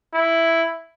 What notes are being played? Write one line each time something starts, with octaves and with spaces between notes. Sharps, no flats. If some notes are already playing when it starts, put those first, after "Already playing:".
E4